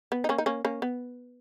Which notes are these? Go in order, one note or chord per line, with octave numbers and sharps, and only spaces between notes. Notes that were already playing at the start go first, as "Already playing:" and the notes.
B3
D#4
A#3 C#4
D#4
A#3 C#4
A#3 C#4
B3